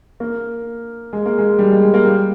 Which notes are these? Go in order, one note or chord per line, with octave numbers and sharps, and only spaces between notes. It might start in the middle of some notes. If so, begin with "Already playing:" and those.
A#3
G#3
A#3
G#3
G3
G#3
G#3
A#3
G3